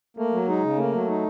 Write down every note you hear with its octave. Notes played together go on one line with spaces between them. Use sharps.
A3 A#3
F#3
G#3 D#4
C#3
A3 A#3
F#3
D#4